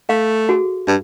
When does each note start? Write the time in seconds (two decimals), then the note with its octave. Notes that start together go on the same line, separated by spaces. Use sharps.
0.09 A3 F5
0.49 F#4 G#4 A4
0.88 G2